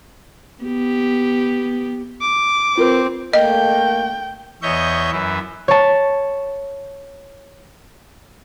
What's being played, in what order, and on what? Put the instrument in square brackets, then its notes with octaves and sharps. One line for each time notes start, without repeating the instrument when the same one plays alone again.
[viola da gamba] B3 G4
[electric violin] D6
[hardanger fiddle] C4 [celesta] F4 A#4 B4
[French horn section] A3 A#3 [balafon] D#5 [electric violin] G5
[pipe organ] E2 C#5 D#5 E5 C#6 G6
F#2 E3 E4
[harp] C#5 A5